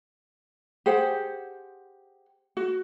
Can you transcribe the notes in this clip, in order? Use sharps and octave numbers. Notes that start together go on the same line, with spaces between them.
G4 G#4 C5 F#5
F#4